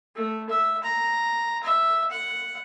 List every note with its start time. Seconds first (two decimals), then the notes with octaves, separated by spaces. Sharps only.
0.15 A3
0.49 E5
0.83 A#5
1.63 E5
2.11 F#5